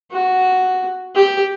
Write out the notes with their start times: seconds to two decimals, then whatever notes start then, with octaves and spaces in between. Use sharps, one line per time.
0.12 F#4
1.15 G4